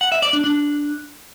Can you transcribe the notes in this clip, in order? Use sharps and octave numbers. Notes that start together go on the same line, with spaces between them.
F#5
E5
D5
D4
D4